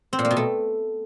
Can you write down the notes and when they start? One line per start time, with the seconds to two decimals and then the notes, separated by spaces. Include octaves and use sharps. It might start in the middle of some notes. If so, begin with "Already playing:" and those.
0.13 C4
0.19 A#2
0.25 A#3
0.31 B2
0.37 A3